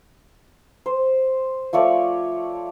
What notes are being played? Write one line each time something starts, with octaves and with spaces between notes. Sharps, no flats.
C5
F3 A3 C#5 D5